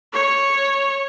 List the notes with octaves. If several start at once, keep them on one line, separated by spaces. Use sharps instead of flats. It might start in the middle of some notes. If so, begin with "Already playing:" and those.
C#5